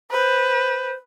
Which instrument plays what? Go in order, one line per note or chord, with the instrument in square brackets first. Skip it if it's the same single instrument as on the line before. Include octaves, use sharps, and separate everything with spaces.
[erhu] B4 [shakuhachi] C5